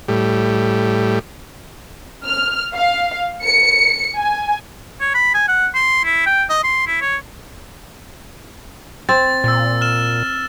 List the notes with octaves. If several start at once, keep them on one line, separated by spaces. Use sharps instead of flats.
A2 G3
F6
F5
C#7
G#5
C#5
B5
G#5
F#5
C6
E4
G5
D#5
C6
E4
C#5
C4 A6
A#2 E6 A6
F6 E7